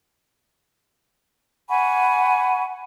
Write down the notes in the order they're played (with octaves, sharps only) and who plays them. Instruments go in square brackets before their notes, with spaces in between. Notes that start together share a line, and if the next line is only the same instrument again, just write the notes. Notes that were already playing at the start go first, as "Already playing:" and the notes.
[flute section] F#5 G#5 B5 C#6